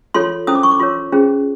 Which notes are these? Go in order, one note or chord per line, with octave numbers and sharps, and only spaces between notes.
F4 A4 C#5 C6
C#4 E4 A4 C5 D#6
D6
C#6
D6
F4 A#4 C#5 C6
C#4 F4 G#4 C5